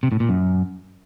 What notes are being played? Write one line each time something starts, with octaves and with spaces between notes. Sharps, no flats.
C3
A2
A#2
F#2